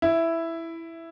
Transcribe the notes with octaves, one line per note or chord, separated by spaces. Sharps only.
E4